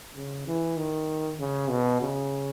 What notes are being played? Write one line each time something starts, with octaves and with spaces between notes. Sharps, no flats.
C#3
E3
D#3
C#3
B2
C#3